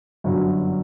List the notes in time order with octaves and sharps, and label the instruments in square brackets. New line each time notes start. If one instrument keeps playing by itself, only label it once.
[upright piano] G1 F#2 D3 F#3